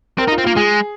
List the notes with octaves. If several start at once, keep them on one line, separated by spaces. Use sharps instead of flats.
C4 A#4
D#4
F4
C4
A#3 F4
G#3 G#4